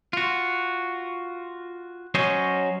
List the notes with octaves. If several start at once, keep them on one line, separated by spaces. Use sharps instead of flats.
F4 F#4
F#3 C#4 C5 C#5 D#5